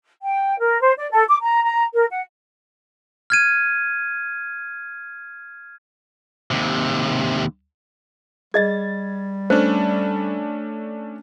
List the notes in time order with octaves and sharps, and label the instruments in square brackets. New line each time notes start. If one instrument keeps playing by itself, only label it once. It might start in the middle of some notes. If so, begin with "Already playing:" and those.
[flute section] G5
A#4
C5
D5
A4
D6
A#5
A#5
A#4
F#5
[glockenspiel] F6 G#6 D#7
[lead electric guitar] D#2 C3
[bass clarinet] G3 [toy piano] G#4 D#5 [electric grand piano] G#6 A6
[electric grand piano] A3 C#4 D4 [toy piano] C5